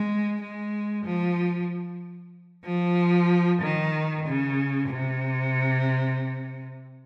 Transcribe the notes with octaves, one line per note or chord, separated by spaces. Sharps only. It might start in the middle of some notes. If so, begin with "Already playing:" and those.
Already playing: G#3
G#3
F3
F3
D#3
C#3
C3